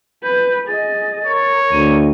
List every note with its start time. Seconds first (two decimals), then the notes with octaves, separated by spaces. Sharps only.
0.23 B4 G6
0.67 G#4 D#5 A6
1.26 A#4 C#5
1.72 D2 D#7